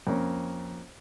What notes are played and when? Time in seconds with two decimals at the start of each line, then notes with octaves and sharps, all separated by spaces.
0.07 F2 A#3 C#4